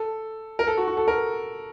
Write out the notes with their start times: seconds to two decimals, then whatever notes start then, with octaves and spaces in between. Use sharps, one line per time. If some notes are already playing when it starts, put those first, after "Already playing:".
Already playing: A4
0.59 A#4
0.67 A4
0.77 F#4
0.88 F#4
0.97 A4
1.08 A#4